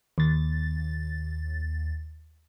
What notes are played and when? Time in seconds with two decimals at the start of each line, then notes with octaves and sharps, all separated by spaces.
0.18 D#2 A6